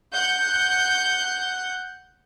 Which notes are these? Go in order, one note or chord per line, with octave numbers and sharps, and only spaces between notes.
F#5 G6